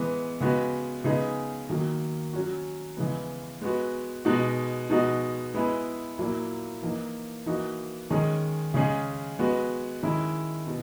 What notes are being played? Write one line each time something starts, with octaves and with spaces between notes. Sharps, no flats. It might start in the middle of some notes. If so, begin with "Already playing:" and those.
Already playing: E3 G#3 B3
C#3 G#3 B3 F#4
C#3 G#3 B3 D#4 G#4
D#3 F#3 A#3
F#3 C#4 F#4
C#3 E3 G#3 B3
G#3 B3 F#4
B2 G#3 D#4 F#4
B2 G#3 D#4 F#4
G#3 B3 E4 G#4
A#2 F#3 A#3 E4
E3 A#3 D#4
E3 A#3 D#4 F#4
D#3 G#3 C#4 G#4
C#3 G#3 C#4 G#4
G#3 B3 F#4
D#3 G#3 C#4 E4
B2